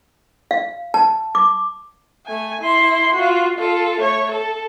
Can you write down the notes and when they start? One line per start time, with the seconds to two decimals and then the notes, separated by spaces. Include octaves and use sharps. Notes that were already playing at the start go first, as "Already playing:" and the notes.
0.51 F5
0.94 A5
1.35 D6
2.26 A3 G#5
2.61 E4 C6
3.14 F4 F#4
3.58 F4 A4
4.01 A3 C#5
4.31 A4